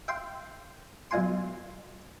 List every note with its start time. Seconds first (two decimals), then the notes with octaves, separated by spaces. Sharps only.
0.08 E5 F5 G5 C6
1.11 B1 F#2 F4 G#5 C6